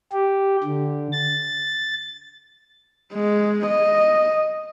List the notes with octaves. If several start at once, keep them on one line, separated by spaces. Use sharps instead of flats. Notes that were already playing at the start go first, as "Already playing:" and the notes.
G4
D3
A6
G#3
D#5